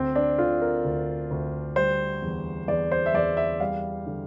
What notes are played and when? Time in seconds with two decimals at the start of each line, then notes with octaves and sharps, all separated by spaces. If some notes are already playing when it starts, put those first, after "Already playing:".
Already playing: D2 C4
0.16 D4
0.38 D3 F4
0.62 A#4
0.84 D2
1.31 D2
1.76 G3 C5
2.22 E2
2.68 E2 D5
2.92 C5
3.06 E5
3.14 E2 D5
3.37 E5
3.60 G3 F5
4.06 D3